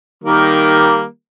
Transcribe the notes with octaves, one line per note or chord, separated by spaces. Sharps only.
D#3 G3 A#3